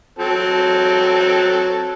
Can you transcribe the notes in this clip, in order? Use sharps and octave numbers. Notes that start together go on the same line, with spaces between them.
F#3 C4 A4